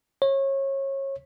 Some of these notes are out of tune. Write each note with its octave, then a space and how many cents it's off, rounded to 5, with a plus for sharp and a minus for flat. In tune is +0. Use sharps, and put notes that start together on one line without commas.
C#5 -25